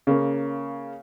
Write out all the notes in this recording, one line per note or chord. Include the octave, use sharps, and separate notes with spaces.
C#3 A#3